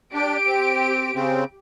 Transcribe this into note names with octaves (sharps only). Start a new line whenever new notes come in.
D4 G4 D7
C4
C#3 C4